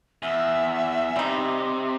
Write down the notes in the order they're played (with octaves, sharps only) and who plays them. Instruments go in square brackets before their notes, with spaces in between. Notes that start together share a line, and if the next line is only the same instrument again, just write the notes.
[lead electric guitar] E2 [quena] E5
[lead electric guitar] C3 [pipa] G3 D#4